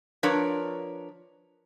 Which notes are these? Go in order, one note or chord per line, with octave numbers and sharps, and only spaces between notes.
F3 D4 A#4 B4 C#5